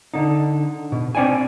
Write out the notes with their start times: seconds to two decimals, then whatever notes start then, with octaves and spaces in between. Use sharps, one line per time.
0.14 D3 D#4
0.92 B2
1.15 C4 D4 D5 G5 G#5